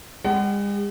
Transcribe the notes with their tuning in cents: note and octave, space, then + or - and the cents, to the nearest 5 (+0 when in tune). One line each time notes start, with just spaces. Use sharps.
G#3 -45 F#5 +35